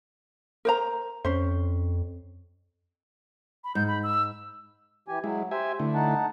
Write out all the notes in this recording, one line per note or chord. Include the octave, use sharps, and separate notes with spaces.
A#4 C5 A#5
F2 C#4 C5
B5
G#2 G6
B5
E6
E3 G4 G#5
F#3 G#3 E4
G4 C5 E5 G#5
D3 A3 E4
D#4 F#5 A5